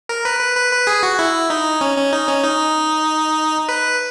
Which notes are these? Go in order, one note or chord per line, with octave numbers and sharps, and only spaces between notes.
A#4
B4
B4
B4
B4
G#4
F#4
E4
D#4
C#4
C#4
D#4
C#4
D#4
B4